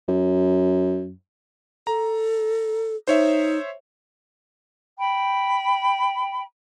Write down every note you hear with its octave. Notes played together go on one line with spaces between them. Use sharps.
F#2
A4 A#5
D#4 C5 C#5 E5
G5 B5